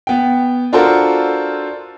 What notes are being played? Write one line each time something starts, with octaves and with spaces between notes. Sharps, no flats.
B3 G5
D4 F4 F#4 A4 A#4 C5